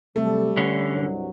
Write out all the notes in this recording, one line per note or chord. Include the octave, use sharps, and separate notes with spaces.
C3 F#3 G3 A3 A4
G2 D3 C#4
C2 G2 F#3